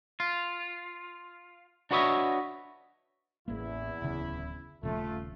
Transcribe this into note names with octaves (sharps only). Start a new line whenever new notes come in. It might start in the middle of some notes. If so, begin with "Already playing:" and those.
F4
D4 F#4 B4 C#5 D#5 E5
A1 E2 A#3 E4
D1 C#3
D#1 C#3 F3 A3 F4